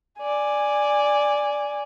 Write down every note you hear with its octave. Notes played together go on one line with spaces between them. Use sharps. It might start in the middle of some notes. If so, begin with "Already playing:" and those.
D5 G#5